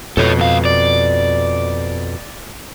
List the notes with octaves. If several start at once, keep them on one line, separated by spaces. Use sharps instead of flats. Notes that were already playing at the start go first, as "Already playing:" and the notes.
F2 B2 A4 C#5
C#2 F5
D5